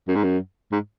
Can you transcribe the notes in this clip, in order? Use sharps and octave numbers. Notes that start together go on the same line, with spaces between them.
F#2
G#2
F#2
G#2